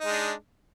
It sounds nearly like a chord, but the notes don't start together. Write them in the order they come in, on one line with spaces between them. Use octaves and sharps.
D#4 G#3 D4